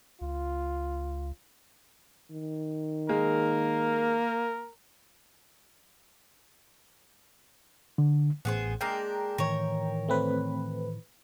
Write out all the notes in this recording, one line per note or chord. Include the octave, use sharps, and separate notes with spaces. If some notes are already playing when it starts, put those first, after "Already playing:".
C#2 F4
D#3
G#3 A#3 A#4
D3
A1 B3 G#4 C5
G#3 A#3 D4 G5 A#5
A2 D#3 E3 A#4 C#5
A3 C4 B4